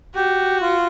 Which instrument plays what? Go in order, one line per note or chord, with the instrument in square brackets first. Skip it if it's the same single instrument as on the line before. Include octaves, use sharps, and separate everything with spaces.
[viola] F#4 [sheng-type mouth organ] G4
[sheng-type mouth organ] F4